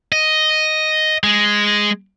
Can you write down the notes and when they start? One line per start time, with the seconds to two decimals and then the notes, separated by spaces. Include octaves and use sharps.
0.12 D#5
1.24 G#3